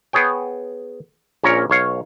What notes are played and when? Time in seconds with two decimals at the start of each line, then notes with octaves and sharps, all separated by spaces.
0.13 B3 G#4 C#5 G5
1.44 A#1 A#2 C#4 A#4 C#5
1.70 B1 C#5 F5